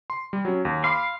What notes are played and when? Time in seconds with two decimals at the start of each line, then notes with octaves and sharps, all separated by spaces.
0.10 C6
0.33 G3
0.45 F#3 C#4
0.65 D#2
0.84 F5 B5 C6 D6